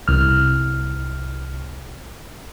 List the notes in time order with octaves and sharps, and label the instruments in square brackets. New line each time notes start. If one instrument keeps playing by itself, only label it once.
[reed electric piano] C2 F6